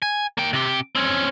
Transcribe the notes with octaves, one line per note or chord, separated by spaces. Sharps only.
G#5
A#3 G5
C3 G4
C4 C#4